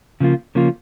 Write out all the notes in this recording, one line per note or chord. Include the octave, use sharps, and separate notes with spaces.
C#3 F3 A#3 F4
C#3 F3 A#3 F4